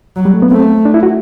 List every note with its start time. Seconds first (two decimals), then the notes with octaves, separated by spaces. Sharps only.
0.16 F#3
0.25 G3
0.34 A3
0.42 B3
0.51 A3 C4
0.85 D4
0.94 E4
1.03 F#4